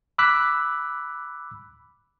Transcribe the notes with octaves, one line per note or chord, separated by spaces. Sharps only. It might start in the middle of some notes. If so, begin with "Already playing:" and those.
B5 D6 E6 F#6 B6